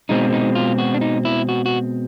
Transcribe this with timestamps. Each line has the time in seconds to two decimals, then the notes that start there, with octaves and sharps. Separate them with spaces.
0.09 B2 G#3 C4 D#4
0.33 D#4
0.55 F4
0.78 F#4
0.94 D4
1.01 D#4
1.25 E4
1.49 F#4
1.66 F#4